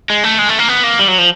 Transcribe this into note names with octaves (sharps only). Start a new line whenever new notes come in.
G#3
A3
G#3
A3
A#3
B3
A#3
G3
F#3
F3